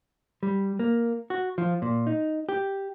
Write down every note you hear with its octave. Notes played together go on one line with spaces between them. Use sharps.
G3
A#3
F#4
F3
A#2
D#4
G4